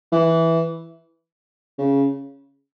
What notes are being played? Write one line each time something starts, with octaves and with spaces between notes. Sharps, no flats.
E3
C#3